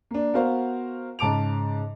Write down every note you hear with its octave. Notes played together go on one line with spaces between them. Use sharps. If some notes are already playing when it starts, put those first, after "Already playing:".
A#3 D4
B3 F#4 A#4 C5 F5
G#2 C#3 A5 D6 D7 F7